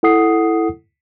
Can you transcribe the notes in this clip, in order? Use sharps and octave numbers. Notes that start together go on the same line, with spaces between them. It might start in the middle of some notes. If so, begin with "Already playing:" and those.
E4 A4 F#5 D#6 C7